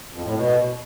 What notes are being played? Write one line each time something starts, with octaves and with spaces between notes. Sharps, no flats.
F2
A2
B2